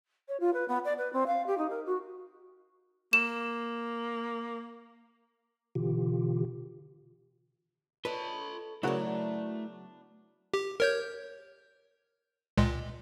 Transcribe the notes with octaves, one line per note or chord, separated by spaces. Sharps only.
C#5
F4
B4
B3
D5
B4
C4
F5
G4
D#4
A#4
F#4
A#3 E7
B2 D3 E3 F4 G4
F4 A4 B4 C#5 D#5 B5
C#3 F#3 A3 B3 D4 E4 F#4 A#4
G4
A#4 C#5 G6
C#2 A#2 G#3